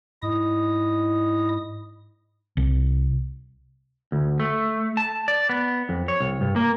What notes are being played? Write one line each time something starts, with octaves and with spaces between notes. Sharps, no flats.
G#2 E4 D#5 D#6
C2
D2
A3
A5
D5
B3
F2
C#5
C2
G2
A#3